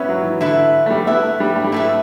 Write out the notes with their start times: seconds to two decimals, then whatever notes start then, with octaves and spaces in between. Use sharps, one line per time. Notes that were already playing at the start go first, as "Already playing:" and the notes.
Already playing: B3 C#4 E4 B4 E5
0.09 F#3
0.24 E3
0.40 D3 E4 B4 E5
0.86 A3
0.90 G3
1.06 B3 E4 B4 E5
1.23 A3
1.40 G3
1.56 A3
1.64 G3
1.72 A3 E4 B4 E5